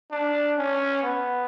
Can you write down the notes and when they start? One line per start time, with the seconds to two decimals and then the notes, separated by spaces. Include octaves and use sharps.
0.11 D4
0.57 C#4
1.03 B3